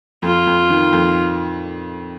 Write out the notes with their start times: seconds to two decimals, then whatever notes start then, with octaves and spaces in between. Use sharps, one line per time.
0.23 F2 F4
0.47 F2
0.70 D#3
0.93 F2